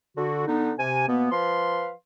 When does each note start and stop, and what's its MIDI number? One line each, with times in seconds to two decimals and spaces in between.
0.17 0.45 50
0.17 0.45 66
0.47 0.73 50
0.47 0.73 59
0.47 0.73 62
0.47 0.73 63
0.79 1.05 48
0.79 1.05 80
1.08 1.31 47
1.08 1.31 58
1.08 1.31 59
1.32 1.91 53
1.32 1.91 71
1.32 1.91 77
1.32 1.91 84